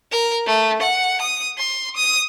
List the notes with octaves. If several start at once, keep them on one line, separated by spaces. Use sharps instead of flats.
A#4
A3
F#5
D#6
C6
D#6